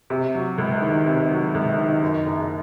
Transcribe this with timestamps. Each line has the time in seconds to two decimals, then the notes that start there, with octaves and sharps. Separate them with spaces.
0.10 C3
0.35 F#3
0.58 C#2
0.81 D#3
1.06 C3
1.30 F#3
1.55 C#2
1.77 D#3
2.02 F#2
2.26 F#1